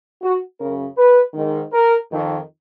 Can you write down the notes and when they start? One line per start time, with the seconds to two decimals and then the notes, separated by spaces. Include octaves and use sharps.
0.22 F#4
0.59 F#2 C#3 A#4
0.96 B4
1.34 G#2 D#3
1.72 A#4
2.10 F2 D#3